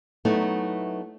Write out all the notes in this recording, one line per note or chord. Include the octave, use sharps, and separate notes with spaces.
F#3 A3 B3 D#4 E4